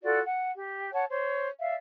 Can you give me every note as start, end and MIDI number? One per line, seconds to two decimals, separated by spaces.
0.03 0.20 65
0.03 0.20 66
0.03 0.20 69
0.03 0.20 74
0.25 0.51 78
0.56 0.90 67
0.93 1.05 73
0.93 1.05 78
0.93 1.05 81
1.10 1.48 72
1.10 1.48 73
1.60 1.75 74
1.60 1.75 76
1.60 1.75 77